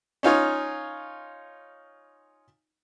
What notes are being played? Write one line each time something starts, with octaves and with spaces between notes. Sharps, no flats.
C#4 D#4 F4 C#5